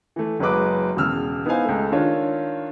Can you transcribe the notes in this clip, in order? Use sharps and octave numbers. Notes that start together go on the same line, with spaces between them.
E3 A3
F#1 F#3 G#3 B4 D6
E1 E2 C#3 E6 F6
B3 D#4 E4 C5 F5 G#5
C#2 A3
D#3 D4 F4 C#5